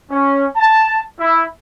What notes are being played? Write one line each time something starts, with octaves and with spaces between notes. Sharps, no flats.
C#4
A5
E4